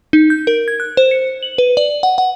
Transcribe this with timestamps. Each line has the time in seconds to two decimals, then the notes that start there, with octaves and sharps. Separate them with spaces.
0.13 D#4
0.30 G6
0.47 A#4
0.68 G#6
0.80 F#6
0.97 C5
1.11 C#7
1.43 F#7
1.58 B4
1.77 D5
2.03 F#5
2.18 F#5